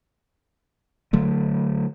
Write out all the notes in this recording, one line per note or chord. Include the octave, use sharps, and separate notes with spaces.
D3 F#3 A3